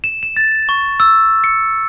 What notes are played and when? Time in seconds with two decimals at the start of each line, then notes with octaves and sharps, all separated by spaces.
0.04 E7
0.23 E7
0.37 A6
0.69 C#6
1.00 E6
1.44 C#7